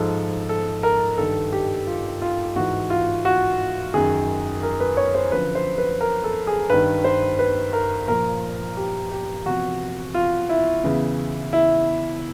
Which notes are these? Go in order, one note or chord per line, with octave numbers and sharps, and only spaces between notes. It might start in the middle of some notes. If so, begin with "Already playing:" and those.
Already playing: G#2 F3 A4
A4
A#4
G2 D#3 A4
G4
F4
F4
G#2 E3 F#4
F4
F#4
F#2 D#3 G#4
A#4
B4
C#5
C5
F#2 D3 F3 B4
C5
B4
A#4
A4
G#4
G2 D#3 B4
C5
B4
A#4
A#2 F3 A#4
G4
G4
E2 C3 F3 F#4
F4
E4
E2 C#3 E3
E4